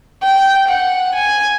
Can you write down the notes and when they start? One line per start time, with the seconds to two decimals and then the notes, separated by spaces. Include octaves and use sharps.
0.23 G5
0.68 F#5
1.15 G#5